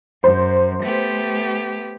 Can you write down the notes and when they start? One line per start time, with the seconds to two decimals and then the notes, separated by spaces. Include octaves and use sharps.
0.24 F#2 C5
0.83 A3 B3 G4